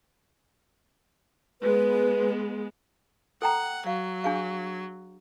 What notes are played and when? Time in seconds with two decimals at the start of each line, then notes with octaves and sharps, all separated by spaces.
1.62 G#3 B3 B4
3.42 A4 F#5 G5 A#5
3.87 F#3 F5
4.24 D4 G#4 F5